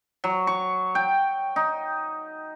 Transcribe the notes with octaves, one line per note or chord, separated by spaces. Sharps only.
F#3
C#6
G5
D#4